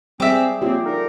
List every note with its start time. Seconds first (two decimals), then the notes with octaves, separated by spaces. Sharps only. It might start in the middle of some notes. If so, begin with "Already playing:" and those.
0.20 G3 C4 G#4 E5 D6
0.62 F#3 A#3 C4 F4 G4
0.85 D3 D#4 A#4